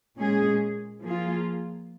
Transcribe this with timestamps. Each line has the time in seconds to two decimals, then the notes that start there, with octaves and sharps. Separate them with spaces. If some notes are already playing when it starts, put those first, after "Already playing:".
0.16 A#2 G#3 C#4 G#4
1.02 F3 A#3 F4 G#4